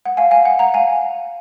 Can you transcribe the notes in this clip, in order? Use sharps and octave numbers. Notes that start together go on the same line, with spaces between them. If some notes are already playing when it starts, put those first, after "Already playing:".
F#5
F5 G#5
F5 G#5
F#5
F#5 A#5
F5 G#5